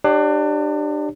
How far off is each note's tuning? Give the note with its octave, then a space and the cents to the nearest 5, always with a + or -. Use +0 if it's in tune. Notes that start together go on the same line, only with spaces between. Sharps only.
D4 +30 G4 +0 C#5 +0